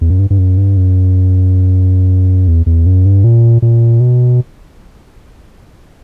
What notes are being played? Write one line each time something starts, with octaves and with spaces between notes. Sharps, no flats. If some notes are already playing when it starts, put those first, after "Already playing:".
E2
F#2
G2
G2
F#2
G2
F#2
E2
E2
F#2
G2
A#2
A#2
B2